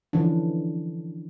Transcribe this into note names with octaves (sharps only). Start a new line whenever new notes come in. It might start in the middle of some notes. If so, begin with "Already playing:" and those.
D3 E3 F3 C#4 D4